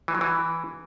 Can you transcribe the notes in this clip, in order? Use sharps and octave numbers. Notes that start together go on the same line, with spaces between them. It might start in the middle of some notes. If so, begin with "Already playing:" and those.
E3
F#3
E3